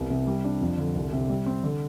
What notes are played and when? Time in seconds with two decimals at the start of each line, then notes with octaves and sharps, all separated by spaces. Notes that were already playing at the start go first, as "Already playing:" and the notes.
Already playing: C2 B3
0.10 C3
0.27 G3
0.44 D4
0.61 F2
0.78 D3
0.95 C2
1.12 C3
1.30 G3
1.46 C4
1.64 D3